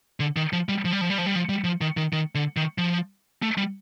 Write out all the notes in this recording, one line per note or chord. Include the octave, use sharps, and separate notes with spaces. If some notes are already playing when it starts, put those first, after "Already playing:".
D3
D#3
F3
G3
F3
G3
F3
G3
F3
G3
F3
G3
F3
D#3
D#3
D#3
D3
D#3
F3
A3
G3